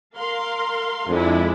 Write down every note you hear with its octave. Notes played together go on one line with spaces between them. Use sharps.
A#4 F5 C6
F2 G#3 D4 E4